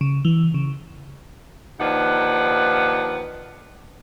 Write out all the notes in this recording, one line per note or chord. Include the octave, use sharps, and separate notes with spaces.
C#3
E3
C#3
D#2 F3 D4 D#4 B4 F#5